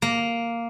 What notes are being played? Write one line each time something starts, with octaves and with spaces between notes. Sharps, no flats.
A#3